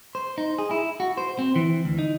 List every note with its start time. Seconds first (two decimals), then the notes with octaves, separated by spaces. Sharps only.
0.15 C5
0.38 D#4
0.59 G#4
0.71 E4
1.00 F#4
1.17 C5
1.39 C4
1.56 E3
1.85 D2
1.99 D#4